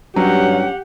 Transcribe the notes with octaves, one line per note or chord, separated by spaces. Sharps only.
G2 F#3 C#4 G4 F#5